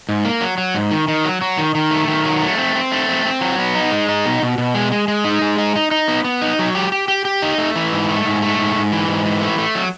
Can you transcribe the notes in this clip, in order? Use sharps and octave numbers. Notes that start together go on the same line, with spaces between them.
G#2
A#3
F#3
F#3
G#2
D#3
D#3
F#3
F#3
D#3
D#3
A3
D#3
F#3
A3
C4
C4
A3
C4
C4
F#3
B3
D#4
G#3
D#4
B2
B2
B2
G#3
G#3
G#3
D#4
G#3
D#4
D#4
D#4
B3
B3
D#4
F#3
G4
G4
G4
G4
D#4
A3
E3
G#2
A3
G#2
A3
G#2
G#2
E3
G#2
E3
A3
A3
F#3